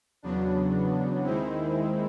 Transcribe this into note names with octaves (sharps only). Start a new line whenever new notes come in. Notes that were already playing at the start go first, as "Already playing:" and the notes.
E2 C#3 F#3 B3 D4
D#2 D#3 G#3 C4 E4